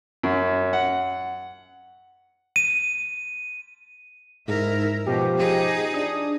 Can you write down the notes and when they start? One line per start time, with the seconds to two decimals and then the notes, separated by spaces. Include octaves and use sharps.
0.23 F#2
0.73 F#5
2.56 D#7
4.48 G#2 E4 A#4
5.06 B2 F3 G4
5.38 D#4 G#4
5.94 D4 D#6